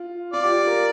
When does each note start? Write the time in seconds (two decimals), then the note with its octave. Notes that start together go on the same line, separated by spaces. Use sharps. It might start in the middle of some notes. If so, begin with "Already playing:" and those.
Already playing: F4
0.33 F4 D5
0.44 G4
0.50 F4
0.67 A#4